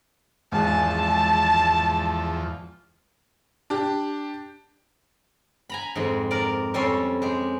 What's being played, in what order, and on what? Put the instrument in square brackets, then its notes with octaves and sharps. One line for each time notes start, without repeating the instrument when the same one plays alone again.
[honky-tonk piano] G#1 G#3 G#5 [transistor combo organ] E2 F3 [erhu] A5
[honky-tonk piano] D4 G4
[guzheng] G#5 A#5 B5
F2 G#2
A#4 D5
F2 G3 C#4 A4 C#5 C6
G#3 G4